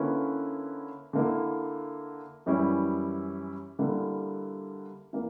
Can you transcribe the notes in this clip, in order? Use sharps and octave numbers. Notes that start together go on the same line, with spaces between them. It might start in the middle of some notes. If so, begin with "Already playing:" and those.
Already playing: D3 A#3 C#4 E4 B4
D3 A#3 E4
F#2 E3 G3 C#4 E4
D3 G3 A#3 E4
E3 A#3